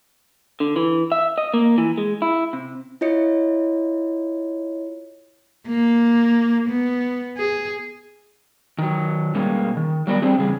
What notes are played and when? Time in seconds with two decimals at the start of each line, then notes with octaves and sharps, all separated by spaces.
0.60 D3
0.76 E3
1.12 E5
1.38 D#5
1.54 A#3
1.78 E3
1.98 G#3
2.22 E4
2.53 C3
3.01 E4 F4 C#5 D#5 C#7
5.68 A#3
6.69 B3
7.38 G#4
8.78 D#3 F#3
9.34 B2 G3 G#3 A#3 C#4
9.77 D#3
10.07 F#3 G3 B3 A#4 C5 D5
10.22 G3 C4 D4 G4 G#4
10.37 E2 C#3 G3 G#4